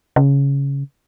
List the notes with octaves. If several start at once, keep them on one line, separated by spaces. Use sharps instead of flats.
C#3